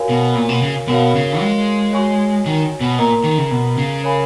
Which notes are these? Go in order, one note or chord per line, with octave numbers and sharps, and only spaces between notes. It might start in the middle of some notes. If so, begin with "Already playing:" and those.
Already playing: F#4 A#4 C#5 F5 G#5
B2
A#2
B2
C#3
B2 F#4 A#4 C#5 F5
C#3
G#3
F#4 C#5 G#5 C#6
D#3
B2
A#2 A#4 D#5 A#5
D#3
C#3
B2
C#3
A#4 C#5 F5 G#5 B5